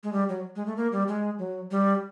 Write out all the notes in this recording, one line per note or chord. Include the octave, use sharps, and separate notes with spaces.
G#3
G3
F#3
G#3
A3
A#3
G3
G#3
F#3
G3